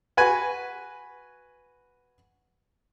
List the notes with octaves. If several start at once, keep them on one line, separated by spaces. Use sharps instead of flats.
F#4 B4 G#5